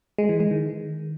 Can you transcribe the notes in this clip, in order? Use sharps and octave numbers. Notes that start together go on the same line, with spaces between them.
G#3
E3
G#3
D#3